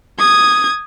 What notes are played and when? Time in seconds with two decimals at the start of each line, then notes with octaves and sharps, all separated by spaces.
0.19 D#6 G#6